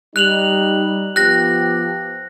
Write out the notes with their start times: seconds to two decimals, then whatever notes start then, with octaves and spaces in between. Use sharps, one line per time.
0.16 G3 D#4 F#6 F7 F#7
1.16 F3 B3 G4 F#6 A#6